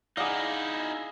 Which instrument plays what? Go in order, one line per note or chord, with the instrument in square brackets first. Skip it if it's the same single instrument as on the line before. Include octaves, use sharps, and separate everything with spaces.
[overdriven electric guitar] D#4 E4 [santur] G#4 F5 [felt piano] D5 F#5 D6